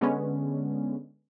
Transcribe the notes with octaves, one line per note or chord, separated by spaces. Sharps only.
D3 G#3 B3 C#4